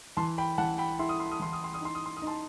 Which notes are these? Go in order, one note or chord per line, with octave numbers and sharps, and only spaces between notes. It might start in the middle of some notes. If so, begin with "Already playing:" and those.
E3 A5 C6
G5 B5
E3 F#5 A5
G5 B5
E4 C6
D#6
C6
D#6
E3 C6
D#6
C6
D#6
D#4 C6
D#6
C6
D#6
D#4
A5 C6